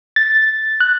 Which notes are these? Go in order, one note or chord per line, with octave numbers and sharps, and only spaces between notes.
A6
F#6